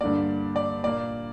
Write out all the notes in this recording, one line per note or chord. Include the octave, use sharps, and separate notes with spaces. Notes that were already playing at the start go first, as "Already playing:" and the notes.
G2 D3 A#3 D5
D5
A#2 A#3 D5